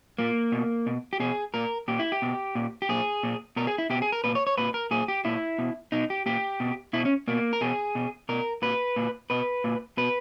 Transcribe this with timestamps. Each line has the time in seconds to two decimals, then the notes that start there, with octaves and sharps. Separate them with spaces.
0.18 A#2 A#3
0.52 B2
0.86 B2
1.13 G4
1.20 B2 G#4
1.54 A#2 A#4
1.88 A#2 G4
1.99 E4
2.12 G4
2.22 B2
2.55 A#2
2.82 G4
2.89 A#2 G#4
3.23 A#2
3.56 B2 A#4
3.67 G#4
3.78 E4
3.90 B2 G4
4.02 G#4
4.12 A#4
4.24 A#2 B4
4.35 C#5
4.47 C#5
4.58 A#2 B4
4.74 A#4
4.91 A#2 G#4
5.08 G4
5.25 A#2 E4
5.59 B2
5.92 B2 D#4
6.10 G4
6.26 A#2 G4
6.60 B2
6.93 B2 E4
7.05 C#4
7.28 B2 A#3
7.53 A#4
7.61 B2 G#4
7.95 B2
8.29 B2 A#4
8.62 A#2 B4
8.96 A#2
9.30 B2 B4
9.64 A#2
9.97 B2 B4